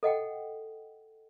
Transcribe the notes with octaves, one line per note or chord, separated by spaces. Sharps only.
A4 D#5 F#5 G5